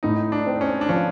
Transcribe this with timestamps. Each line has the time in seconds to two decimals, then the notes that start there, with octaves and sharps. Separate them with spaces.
0.03 A2 D#4
0.32 D4
0.46 C4
0.61 C#4
0.81 D4
0.89 F3 C#4